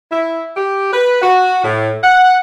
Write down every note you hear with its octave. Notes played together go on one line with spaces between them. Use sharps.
E4
G4
B4
F#4
A2
F#5